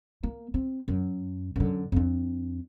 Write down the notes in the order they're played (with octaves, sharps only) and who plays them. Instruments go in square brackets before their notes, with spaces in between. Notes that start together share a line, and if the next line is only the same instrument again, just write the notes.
[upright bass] A#3
C4
F#2
F#2 D3
F2 D4